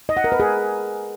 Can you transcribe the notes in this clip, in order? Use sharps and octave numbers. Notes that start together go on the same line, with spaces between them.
D#5
F#5
A#4
B4
G#4